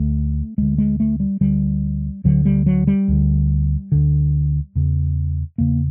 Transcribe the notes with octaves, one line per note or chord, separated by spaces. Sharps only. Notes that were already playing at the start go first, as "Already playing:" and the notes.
Already playing: D2 D3 A3
D2 D3 G#3
G#3
A3
G3
D2 D3 G3
D2 D3 F#3
G3
F#3
G3
D2 D3
D2 D3
E2 C#3
E2 C#3 A#3